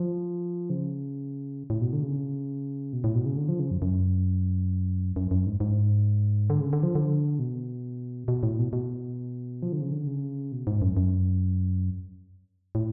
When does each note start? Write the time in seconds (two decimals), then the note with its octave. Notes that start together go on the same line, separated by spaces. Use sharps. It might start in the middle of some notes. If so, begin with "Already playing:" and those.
Already playing: F3
0.70 C#3
1.70 A2
1.81 B2
1.93 D3
2.03 C#3
2.93 B2
3.04 A2
3.15 B2
3.26 C#3
3.37 D3
3.49 F3
3.60 C#3
3.71 F#2
3.82 F#2
5.16 F#2
5.31 F#2
5.46 G#2
5.60 G#2
6.50 D3
6.61 C#3
6.73 D3
6.83 F3
6.95 D3
7.39 B2
8.28 B2
8.43 A2
8.59 B2
8.73 B2
9.63 F3
9.73 D3
9.81 C#3
9.92 D3
10.07 C#3
10.52 B2
10.67 G#2
10.82 F#2
10.97 F#2
12.75 A2